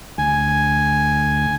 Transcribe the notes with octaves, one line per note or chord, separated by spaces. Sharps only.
D2 G#5